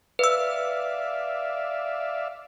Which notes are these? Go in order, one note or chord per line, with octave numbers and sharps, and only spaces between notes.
B4 D5 E5 F5 E6